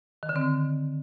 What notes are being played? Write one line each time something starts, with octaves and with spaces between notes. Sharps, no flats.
D#3
D3
C4